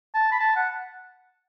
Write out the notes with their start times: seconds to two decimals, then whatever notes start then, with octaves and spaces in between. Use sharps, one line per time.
0.14 A5
0.32 B5
0.40 A5
0.56 F#5